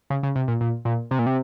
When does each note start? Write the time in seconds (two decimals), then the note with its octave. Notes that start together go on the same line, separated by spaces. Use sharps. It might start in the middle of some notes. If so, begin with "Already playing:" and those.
0.10 C#3
0.23 C#3
0.36 C3
0.48 A#2
0.61 A#2
0.85 A#2
1.11 C3
1.19 A#2
1.26 C3